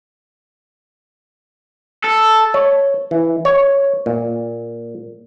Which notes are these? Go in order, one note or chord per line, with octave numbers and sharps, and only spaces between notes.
A4
C#5
E3
C#5
A#2